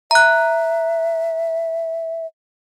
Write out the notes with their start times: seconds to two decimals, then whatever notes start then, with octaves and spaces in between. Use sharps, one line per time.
0.11 E5 A#5 F#6